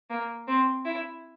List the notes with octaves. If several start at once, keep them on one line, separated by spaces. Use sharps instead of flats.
A#3
C4
E4